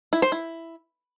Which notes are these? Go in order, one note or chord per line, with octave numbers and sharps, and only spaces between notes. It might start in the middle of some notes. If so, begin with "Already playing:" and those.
E4
C5
E4